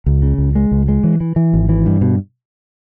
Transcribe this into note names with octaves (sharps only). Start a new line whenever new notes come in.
C#2
C#3
C#2
G#3
C#2
G#3
E3
E3
E3
G#1
E3
G2
B2